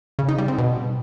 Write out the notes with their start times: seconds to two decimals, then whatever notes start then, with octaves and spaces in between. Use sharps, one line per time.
0.19 C#3
0.29 D#4
0.38 G3
0.48 C4
0.58 B2